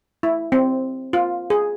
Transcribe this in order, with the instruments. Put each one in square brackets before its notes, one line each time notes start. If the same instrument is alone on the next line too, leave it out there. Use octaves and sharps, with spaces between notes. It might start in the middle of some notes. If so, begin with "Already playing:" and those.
[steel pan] E4
C4
F4
G#4